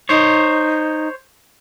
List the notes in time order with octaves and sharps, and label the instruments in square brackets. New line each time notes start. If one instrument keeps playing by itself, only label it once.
[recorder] D#4 [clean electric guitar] C5 C#5